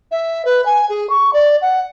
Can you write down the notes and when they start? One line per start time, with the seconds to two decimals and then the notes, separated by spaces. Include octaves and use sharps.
0.11 E5
0.45 B4
0.65 G#5
0.89 G#4
1.09 C#6
1.33 D5
1.61 F#5